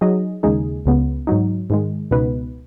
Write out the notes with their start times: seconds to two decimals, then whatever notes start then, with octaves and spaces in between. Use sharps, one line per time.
0.01 F#3 D#4 G#4 D#5
0.43 D#2 C#3 G#3 D#4 G#4
0.86 C#2 C#3 B3
1.27 G#2 F#3 D#4
1.70 G#2 D#3 G#3
2.11 C#2 B2 B3 D#4 B4